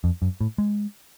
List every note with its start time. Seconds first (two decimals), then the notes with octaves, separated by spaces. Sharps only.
0.04 F2
0.22 F#2
0.41 A2
0.58 G#3